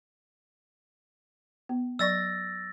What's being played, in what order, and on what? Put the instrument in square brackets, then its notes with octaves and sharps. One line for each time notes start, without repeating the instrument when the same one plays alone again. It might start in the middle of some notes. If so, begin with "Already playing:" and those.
[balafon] B3
[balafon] F#3 D5 C#6 [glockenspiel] E6 A6 A#6